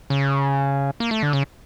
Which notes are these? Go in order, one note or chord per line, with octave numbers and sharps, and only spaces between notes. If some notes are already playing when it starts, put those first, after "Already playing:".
C#3
A#3
A3
D3
C#3